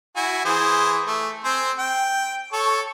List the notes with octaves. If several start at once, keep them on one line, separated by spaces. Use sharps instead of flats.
E4 F#4 G#5
E3 G#4 C5
A3
C4 C5 G#5
G5
A4 C#5 C#6